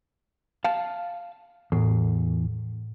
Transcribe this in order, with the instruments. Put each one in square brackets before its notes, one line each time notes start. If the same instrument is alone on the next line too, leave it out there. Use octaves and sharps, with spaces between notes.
[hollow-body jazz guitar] F5 A5
[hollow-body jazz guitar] E2 [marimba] A2